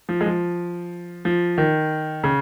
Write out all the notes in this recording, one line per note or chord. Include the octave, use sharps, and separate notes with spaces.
F3
G#3
F3
F3
D#3
C#3